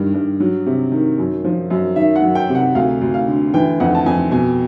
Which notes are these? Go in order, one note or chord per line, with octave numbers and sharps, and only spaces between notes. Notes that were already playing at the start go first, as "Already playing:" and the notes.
Already playing: G2 D#3
G2
F#3
C3
D#3
F#2
F3
F#2
D#3 E5
F#5
F#3
G5
C3
F#5
D2 F5
D2
F5
D3
E3 G5
F2 F#5
A5
F2 G#5
B2 G#5